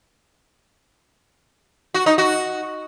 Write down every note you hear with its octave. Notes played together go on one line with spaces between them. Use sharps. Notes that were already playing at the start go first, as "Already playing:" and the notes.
F#4
D#4
F#4